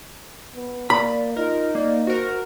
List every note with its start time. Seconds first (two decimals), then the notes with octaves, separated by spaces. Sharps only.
0.55 B3
0.90 A#3 D5 B5
1.37 D#4 F4 A#4
1.75 A#3 D5
2.07 F#4 A#4 C5